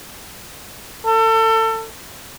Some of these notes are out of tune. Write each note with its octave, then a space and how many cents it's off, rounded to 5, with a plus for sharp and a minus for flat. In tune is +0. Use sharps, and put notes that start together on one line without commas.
A4 +30